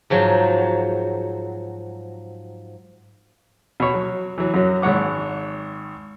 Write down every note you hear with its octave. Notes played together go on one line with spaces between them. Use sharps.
G#2 F3 F#3
B2 C#5
F#3
E3 F#3
F#2 F#3
G#1 G#2 C#5 F#5 D6